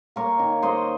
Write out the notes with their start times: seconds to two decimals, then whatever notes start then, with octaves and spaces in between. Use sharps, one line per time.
0.16 A#3 A#4 C#5
0.39 D#3
0.62 A#3 C5 D#5